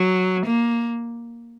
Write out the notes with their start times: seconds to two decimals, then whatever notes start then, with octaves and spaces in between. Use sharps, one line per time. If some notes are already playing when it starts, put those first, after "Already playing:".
Already playing: F#3
0.46 A#3